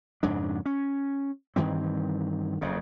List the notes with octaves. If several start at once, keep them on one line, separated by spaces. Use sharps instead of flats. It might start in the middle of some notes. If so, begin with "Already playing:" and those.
F2 G#2 C#3 D4
C#4
G2 D#3 E3 C4
F#1 F2 C#3